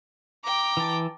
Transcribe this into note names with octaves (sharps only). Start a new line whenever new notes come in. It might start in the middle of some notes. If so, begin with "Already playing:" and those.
G5 A#5 D6
E3 A5